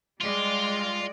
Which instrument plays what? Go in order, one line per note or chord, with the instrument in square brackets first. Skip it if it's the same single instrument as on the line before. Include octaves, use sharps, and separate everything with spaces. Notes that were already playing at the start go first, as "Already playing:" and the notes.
[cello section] G3 G#3 D5 [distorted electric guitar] F4